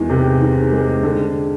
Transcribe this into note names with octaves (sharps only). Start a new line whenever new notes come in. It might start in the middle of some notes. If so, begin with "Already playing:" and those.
Already playing: E2 D#3 G#3
C3
D#3
G#3
D3